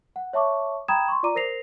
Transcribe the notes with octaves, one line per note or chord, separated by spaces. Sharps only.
F#5
C#5 E5 A5 C#6 D6
G5 A#5 B5 D#6 G#6 E7
C6 C#6
F4 D5 A#5 D6 D#7
A#4 C5 A#6 C7 F7